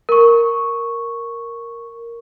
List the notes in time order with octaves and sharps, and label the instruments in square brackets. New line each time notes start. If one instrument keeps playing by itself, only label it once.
[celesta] A#4 C#6